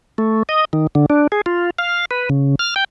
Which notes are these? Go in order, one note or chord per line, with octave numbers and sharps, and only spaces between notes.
A3
D#5
D#3
D3
D4
G#4
F4
F5
B4
C#3
F6
G5